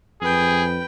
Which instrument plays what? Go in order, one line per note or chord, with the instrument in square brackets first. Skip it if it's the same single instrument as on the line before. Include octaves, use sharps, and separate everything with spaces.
[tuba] F2 [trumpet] G#4 [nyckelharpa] B4 G5